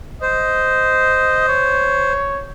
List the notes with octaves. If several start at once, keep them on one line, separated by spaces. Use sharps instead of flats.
C5 D#5
C#5